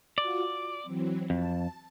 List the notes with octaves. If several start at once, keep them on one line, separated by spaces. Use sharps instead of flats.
F4 F#4 D5
D6
E3 F#3 C4
F2 A5